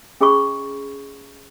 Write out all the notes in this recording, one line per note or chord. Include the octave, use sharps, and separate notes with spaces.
C#4 G#4 D#5 B5 C#6